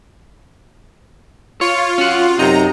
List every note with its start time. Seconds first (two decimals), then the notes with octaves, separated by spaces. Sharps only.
1.61 F4 C#5
1.98 C#4 F#4 F#5
2.39 F#2 C3 D#4 A#5